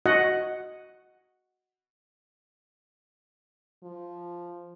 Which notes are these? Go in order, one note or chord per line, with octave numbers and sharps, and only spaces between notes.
F#4 D#5 F#5
F3